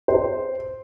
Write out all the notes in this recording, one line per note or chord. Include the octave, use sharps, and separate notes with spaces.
C5